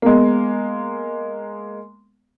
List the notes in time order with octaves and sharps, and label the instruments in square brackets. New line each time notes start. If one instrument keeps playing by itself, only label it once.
[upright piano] G#3 A#3 [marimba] B3